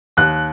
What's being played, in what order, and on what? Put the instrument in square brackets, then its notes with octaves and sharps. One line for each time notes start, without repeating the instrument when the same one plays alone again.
[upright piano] D#2 F#6